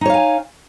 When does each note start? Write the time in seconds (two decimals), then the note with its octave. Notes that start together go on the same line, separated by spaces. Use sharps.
0.01 D#4
0.05 C#5
0.10 F5
0.14 G#5